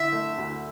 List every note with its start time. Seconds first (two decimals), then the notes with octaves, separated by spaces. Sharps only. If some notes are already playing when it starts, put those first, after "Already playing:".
Already playing: D3 E4 E5
0.13 A3
0.38 D2